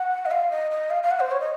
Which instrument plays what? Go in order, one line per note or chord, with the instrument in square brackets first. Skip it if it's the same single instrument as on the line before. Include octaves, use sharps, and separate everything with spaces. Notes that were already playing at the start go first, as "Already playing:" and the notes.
Already playing: [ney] F#5
D#5
F5
D#5
D#5
F5
F5
F#5
C5
C#5
D#5